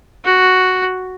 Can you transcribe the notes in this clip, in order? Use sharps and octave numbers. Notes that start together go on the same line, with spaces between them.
F#4